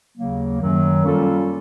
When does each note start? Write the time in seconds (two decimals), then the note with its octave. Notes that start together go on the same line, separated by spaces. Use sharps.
0.17 D#2 C#3 F#3 A#3
0.60 F#2 D#3 F#3
1.04 G3 A#3 C#4 F4 A4